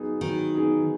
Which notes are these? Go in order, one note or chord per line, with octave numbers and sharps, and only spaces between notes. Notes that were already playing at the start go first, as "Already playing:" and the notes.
Already playing: F#3 B3 D#4 G#4
D#3 F#3
B3 D#4 G#4